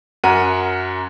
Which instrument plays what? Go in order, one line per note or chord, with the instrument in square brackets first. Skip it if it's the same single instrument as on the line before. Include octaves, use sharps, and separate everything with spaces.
[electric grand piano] F#2 A#4 F#5 D#7